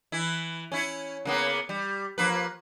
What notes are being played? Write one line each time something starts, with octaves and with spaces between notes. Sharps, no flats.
E3 E4
C#4 E4
C#3 A#3 B3
G3
F3 A#3 B4